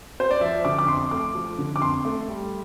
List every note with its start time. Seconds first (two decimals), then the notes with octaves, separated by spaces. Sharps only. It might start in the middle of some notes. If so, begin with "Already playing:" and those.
0.20 C5
0.31 D5
0.41 F3 E5
0.65 D3 D6
0.79 D6
0.88 F2 C6
1.11 A3 D6
1.35 F3
1.58 D3
1.76 D6
1.82 F2 C6
2.05 A3
2.28 G3